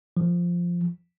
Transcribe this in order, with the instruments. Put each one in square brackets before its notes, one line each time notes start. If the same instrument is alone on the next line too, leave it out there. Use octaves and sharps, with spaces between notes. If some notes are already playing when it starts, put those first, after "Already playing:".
[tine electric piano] F3